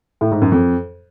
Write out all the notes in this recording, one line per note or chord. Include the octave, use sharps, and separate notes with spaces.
A2
G#2
F#2
F2